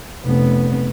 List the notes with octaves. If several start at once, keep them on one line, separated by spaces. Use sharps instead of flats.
F1 B3